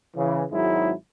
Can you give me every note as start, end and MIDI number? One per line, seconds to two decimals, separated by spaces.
0.16 0.43 49
0.16 0.43 52
0.52 0.92 32
0.52 0.92 54
0.52 0.92 56
0.52 0.92 63
0.52 0.92 64